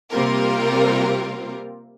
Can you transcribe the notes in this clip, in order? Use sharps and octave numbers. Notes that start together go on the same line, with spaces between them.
C3 G3 A#3 C4 F4 A#4